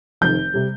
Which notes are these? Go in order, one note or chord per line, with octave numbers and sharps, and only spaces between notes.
F1 F2 D#3 G6
C3 G3